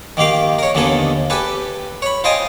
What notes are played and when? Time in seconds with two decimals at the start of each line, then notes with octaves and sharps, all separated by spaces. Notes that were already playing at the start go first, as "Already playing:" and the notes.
0.17 D#3 A#3 G4 F5 D6
0.59 A#4 C#5
0.75 D#2 D3 A#3 B3 A4 G#5
1.30 G4 A4 B4 G#5
2.02 C#5 B5
2.24 F4 C5 D#5 G5 G#5 D#6